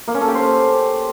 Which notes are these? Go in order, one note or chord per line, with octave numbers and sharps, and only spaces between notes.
A#3
C#4
A4
G4
C5